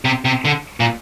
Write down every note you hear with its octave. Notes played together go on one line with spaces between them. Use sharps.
C3
C3
D3
A#2